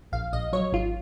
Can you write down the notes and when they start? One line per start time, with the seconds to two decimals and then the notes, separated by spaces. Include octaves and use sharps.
0.12 A#1 F5
0.33 A#1 D#5
0.53 F#3 C#5
0.73 G#1 F4